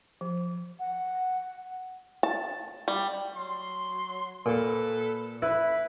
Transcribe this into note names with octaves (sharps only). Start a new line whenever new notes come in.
F3
F#5
A5
G3
F#3 C6
A#2 A4 B4
E4 B4